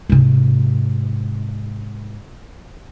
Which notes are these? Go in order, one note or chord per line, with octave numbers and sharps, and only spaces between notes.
G#2 C3